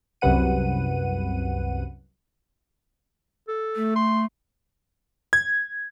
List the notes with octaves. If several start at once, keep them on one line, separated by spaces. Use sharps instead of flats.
C2 F#2 C3 B4 F#5 D#7
A4
A3
C6
G#6